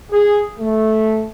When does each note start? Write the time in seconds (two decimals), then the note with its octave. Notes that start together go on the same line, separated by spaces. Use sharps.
0.11 G#4
0.59 A3